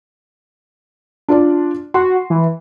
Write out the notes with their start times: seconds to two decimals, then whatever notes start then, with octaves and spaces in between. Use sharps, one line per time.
1.29 D4 F4 D5
1.94 F#4 C6
2.30 E3